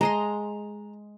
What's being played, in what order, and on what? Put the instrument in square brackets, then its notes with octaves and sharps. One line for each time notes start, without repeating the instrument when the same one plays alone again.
[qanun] G#3 D#5 C6 [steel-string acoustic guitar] A#5